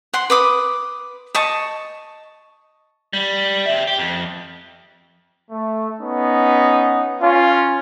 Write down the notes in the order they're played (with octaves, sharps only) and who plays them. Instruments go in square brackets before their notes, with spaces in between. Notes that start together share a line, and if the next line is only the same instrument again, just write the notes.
[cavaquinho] F#5 C6
B4 D6 D#6
D#5 A5 C#6
[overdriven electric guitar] G3
G4 E5
G4
F2
[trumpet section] A3
B3 C#4 D#4
C#4 F4